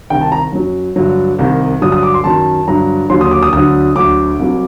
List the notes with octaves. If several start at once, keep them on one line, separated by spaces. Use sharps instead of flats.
C2 C3 D#3 G5
A5
A#5
F#2 F#3
G2 D3 F#3
C2 C3 D#3
G2 D3 F#3 D#6
D#6
D6
C6
F#2 D#3 F#3 A5
G2 D3 F#3 A#5
D#2 D3 F#3 C6
D#6
D6
D#6
D2 D3 F#3 D#6
D2 D3 F#3 D6
C2 C3 F#3